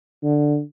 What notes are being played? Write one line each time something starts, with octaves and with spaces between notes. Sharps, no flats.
D3